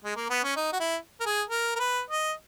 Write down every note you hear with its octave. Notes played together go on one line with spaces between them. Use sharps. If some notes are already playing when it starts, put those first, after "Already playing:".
G#3
A#3
B3
C#4
D#4
F#4
E4
A#4
G#4
A#4
A#4
B4
D#5